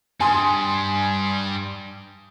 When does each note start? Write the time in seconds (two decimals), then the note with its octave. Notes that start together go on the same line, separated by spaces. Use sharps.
0.20 G2 G#5 C6 D#6